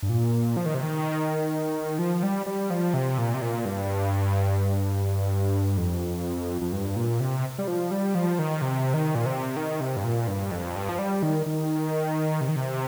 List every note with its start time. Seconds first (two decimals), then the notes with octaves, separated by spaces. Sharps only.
0.02 G2
0.09 A#2
0.57 F3
0.66 D#3
0.74 C3
0.83 D#3
1.99 F3
2.23 G3
2.46 G3
2.70 F3
2.94 C3
3.18 A#2
3.34 C3
3.42 A#2
3.65 G2
5.78 F2
6.61 F2
6.72 G2
6.96 A#2
7.20 C3
7.58 G3
7.68 F3
7.91 G3
8.15 F3
8.39 D#3
8.62 C3
8.94 D#3
9.15 A#2
9.26 C3
9.57 D#3
9.81 C3
9.97 G2
10.04 A#2
10.28 G2
10.51 F2
10.76 G2
10.89 F3
10.99 G3
11.23 D#3
11.46 D#3
12.41 C3
12.48 D#3
12.56 C3